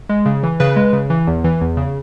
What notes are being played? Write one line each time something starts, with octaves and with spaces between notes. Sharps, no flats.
G#3
C#3
E3
C#3 B4
G#3
C#3
E3
E2
E3
E2
C#3